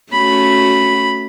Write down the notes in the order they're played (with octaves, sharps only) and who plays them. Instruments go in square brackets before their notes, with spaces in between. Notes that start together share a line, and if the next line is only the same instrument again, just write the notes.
[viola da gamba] A3 C#4 F#4 [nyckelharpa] B5